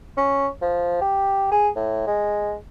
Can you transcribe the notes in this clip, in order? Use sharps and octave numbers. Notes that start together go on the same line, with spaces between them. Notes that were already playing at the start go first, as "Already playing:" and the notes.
C#4
F3
G4
G#4
A2
G#3